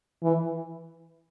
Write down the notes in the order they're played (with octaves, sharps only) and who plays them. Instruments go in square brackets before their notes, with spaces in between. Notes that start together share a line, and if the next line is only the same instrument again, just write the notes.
[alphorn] E3